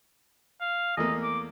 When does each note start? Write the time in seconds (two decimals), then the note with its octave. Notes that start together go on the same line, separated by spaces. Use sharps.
0.61 F5
0.97 E2 A3 A#3 D#5
1.23 D6